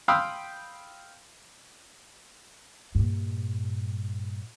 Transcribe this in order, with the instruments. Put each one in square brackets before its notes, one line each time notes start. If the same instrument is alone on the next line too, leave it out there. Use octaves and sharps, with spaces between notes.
[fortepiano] F5 G5 B5 C6 D#6 E6
[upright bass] G2 A#2